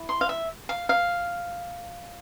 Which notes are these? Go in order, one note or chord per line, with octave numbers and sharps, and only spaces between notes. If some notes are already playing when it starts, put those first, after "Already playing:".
Already playing: E4
C6
F5
E5
F5
F5